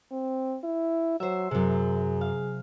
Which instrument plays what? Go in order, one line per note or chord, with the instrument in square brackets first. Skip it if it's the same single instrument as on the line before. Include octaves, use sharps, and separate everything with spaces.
[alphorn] C4
E4
[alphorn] F#3 [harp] C5 E5
[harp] F#2 C3 [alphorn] G#4
[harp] F5